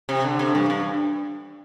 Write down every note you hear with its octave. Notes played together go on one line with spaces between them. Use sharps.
C3
D3
C3
G2
G2